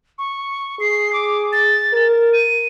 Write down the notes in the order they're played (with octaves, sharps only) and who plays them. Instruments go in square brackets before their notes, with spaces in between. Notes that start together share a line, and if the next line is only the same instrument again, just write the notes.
[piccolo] C#6
[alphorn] G#4 [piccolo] C7
[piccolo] D6
A6
[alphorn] A#4
[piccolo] D#7